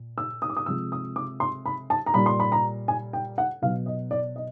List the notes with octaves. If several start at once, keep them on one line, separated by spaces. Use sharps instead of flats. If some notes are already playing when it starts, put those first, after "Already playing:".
Already playing: A#2
E6
D#6
D6
D#6
C3 F3 G#3 E6
D#6
D6
C6
B5
A5
A#5
A#2 G3 B5
C6
B5
A#5
G#5
G5
F#5
B2 F#3 F5
D#5
D5
D#5